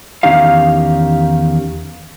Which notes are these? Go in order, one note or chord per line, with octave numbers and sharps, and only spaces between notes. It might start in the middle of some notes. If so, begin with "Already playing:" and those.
E2 D#3 C#4 D#4 G4 F5